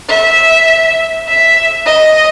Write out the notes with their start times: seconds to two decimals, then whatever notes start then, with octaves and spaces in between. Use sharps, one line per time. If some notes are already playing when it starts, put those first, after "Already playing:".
0.09 E5
1.28 E5
1.86 D#5